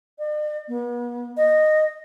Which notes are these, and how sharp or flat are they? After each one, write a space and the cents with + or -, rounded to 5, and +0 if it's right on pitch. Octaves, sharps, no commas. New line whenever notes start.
D5 +45
B3 -40
D#5 -10